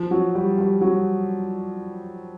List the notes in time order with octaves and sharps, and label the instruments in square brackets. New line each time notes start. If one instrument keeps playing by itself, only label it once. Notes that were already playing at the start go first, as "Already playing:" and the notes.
Already playing: [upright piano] F3
F#3
G3
G3
F#3